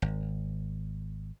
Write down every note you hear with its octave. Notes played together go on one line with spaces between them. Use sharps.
G#1